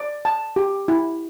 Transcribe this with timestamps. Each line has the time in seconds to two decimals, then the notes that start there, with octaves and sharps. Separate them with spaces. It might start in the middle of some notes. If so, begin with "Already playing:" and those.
Already playing: D5
0.25 A5
0.56 G4
0.88 E4